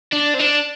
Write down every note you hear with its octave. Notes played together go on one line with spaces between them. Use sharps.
D4
C4
D4